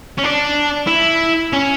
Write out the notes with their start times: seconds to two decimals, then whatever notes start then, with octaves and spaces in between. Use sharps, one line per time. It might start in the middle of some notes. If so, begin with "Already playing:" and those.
0.18 C#4
0.24 D4
0.87 E4
1.52 C#4